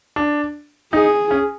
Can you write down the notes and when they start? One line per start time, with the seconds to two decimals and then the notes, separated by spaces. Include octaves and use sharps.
0.16 D4
0.93 D#4 G#4
1.31 C#4